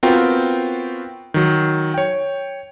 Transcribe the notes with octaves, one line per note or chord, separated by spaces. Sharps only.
B3 C4 F4 F#4 A#4 G5
D#3 F#3
C#5 G5